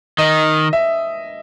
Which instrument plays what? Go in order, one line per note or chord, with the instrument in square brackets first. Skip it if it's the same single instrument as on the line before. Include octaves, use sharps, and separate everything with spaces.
[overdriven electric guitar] D#3 [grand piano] D#5
[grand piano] E5